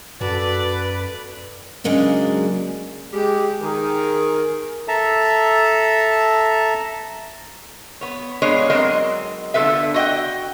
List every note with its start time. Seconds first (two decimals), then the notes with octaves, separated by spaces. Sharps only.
0.21 F#2 F#4 A4 B4 D5
1.84 C#3 F#3 G#3 A#3 D4
3.13 G#3 G4
3.62 D#3 G#4 A#4
4.88 A4 E5 A5 A#5
8.01 B3 C#5
8.42 A#2 G#3 B3 D4 C#5 D#5
8.70 F#3 G#3 C4 A#4 D#5
9.54 D3 B3 F4 A4 B4 E5
9.94 F#4 D#5 F#5 G5